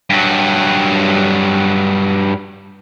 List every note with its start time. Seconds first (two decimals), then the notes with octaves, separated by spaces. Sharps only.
0.10 G2 F#3